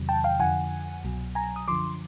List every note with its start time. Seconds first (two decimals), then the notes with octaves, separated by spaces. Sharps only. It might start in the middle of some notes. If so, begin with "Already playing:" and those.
Already playing: E2 C3 D#3 F#3
0.09 G5 A5
0.24 F5 G5
0.39 F2 D3 F3 F#5 G#5
1.04 C2 B2 F#3
1.35 G#5 A#5
1.56 D#6
1.68 F#2 D3 F3 C6 D6